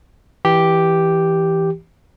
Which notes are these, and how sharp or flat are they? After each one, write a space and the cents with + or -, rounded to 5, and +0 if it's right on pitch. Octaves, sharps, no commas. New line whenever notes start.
E3 -5 G4 +0